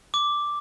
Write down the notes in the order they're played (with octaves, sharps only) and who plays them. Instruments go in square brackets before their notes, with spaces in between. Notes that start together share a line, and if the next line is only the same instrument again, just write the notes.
[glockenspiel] D6